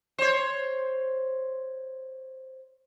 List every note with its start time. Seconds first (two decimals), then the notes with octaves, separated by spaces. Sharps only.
0.18 C5 C#5